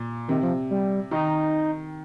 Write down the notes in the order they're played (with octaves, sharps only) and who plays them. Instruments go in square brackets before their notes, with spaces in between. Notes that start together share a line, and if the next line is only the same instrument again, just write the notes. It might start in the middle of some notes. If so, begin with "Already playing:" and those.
Already playing: [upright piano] A#2
[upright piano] C3 [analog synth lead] D#3
[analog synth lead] F3
G3
[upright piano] D#3 [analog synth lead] D#4